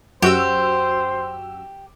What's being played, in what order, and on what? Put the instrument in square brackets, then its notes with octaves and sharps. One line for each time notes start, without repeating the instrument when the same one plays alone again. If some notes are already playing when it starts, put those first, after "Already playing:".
[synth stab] F#2 F#4 E6 [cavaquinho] G4 [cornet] C5